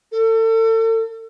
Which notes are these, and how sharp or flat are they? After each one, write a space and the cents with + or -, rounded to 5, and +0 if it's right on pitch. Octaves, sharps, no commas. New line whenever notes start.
A4 +35